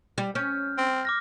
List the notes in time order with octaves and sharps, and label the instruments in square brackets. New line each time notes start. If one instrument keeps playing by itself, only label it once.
[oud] G3
[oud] C#4 [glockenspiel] F6 G6
[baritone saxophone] C4
[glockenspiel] D6 F6 A#6